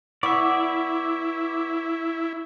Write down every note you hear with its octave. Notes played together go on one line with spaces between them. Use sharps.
B3 E4 D5 E5 C#6